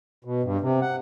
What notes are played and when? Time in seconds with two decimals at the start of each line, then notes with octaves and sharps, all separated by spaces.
0.24 B2
0.43 G2
0.61 C3
0.82 F#5